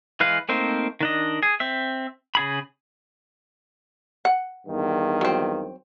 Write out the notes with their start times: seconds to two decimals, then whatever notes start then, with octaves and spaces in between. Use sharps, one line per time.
0.20 E3 G#3 B4 F5
0.49 A3 A#3 C4 D#4 C5
1.01 D#3 D4 D#5
1.43 G#4
1.60 C4 E5
2.35 C#3 G#4 B5
4.25 F#5
4.66 E2 G2 D#3
5.21 F#3 C4